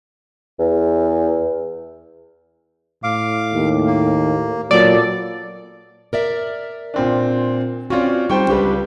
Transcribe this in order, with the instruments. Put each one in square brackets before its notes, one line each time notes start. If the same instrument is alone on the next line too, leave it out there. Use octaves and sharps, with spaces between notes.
[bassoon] E2
[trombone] A2 [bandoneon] F5 D6
[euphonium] D#2
[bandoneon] A#3
[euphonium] A#2 [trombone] F#3 [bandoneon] B3 A4 [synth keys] D5
[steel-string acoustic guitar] A#4 D5 E5
[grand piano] A#2 C4 D4
[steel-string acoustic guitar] C4 F#4 [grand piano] C#4 F4 D5
[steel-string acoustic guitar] G3 C4 D#4 [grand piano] C5 G5 C#6
[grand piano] C#2 G3 [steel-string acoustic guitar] D4 G4 B4